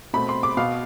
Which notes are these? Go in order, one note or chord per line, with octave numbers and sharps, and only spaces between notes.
B2 A3 C4 B5
C6
D6
B2 B3 F5